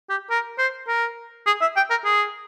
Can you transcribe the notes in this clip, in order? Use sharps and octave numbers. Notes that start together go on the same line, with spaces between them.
G4
A#4
C5
A#4
G#4
E5
G5
A#4
G#4